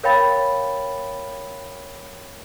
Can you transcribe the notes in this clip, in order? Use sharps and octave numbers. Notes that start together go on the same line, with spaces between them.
A#4 C#5 F5 G5 B5 A6